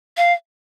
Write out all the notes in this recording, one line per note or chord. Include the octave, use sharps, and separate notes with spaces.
F5